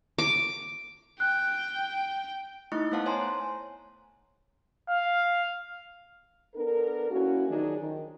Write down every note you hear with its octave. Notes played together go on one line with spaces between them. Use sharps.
D6
G5 F#6
A3 D#4 E4 D#5 C#6
A3 B3 C5 F5 F#5 A5
C5 C#5 G#5 A#5 C6
F5
B3 D4 A4 A#4
A#3 C#4 E4 F#4
D#3 F3 F#3 D4 D#4 G#4
D#3